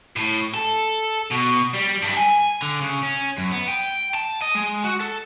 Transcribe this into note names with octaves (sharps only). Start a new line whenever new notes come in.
A2
A4
B2
G3
G2
G#5
D3
C#3
C#4
F#2
B3
G5
A5
D#5
G#3
F#4
A4